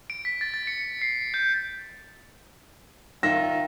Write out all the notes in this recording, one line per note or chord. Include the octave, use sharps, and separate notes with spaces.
D7
B6
A6
A6
C#7
C7
G6
D#3 F4 C#5 E5 A#6